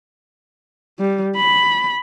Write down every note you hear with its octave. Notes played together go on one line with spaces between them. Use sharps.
G3
B5